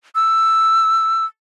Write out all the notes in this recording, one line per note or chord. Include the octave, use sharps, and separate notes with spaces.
E6